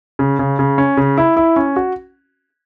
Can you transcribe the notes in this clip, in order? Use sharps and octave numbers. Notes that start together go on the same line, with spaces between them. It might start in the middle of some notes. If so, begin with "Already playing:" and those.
C#3
C#3
C#3
C#4
C#3
E4
E4
C#4
F#4